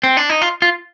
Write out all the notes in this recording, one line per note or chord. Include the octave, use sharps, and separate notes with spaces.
C4
D4
D#4
F4
F4